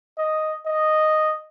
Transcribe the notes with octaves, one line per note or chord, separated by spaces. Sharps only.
D#5
D#5